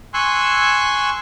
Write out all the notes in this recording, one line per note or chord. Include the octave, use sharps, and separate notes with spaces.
G#5 C6 C#6 E6 F#6